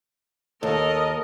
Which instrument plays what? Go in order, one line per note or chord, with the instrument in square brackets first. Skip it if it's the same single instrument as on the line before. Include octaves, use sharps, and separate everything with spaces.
[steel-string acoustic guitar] D#2 [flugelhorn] A4 [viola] A#4 D#5